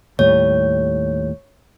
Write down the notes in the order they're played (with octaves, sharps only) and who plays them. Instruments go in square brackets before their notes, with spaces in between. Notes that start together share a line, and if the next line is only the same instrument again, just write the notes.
[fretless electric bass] D#2 A2 G3 [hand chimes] C#5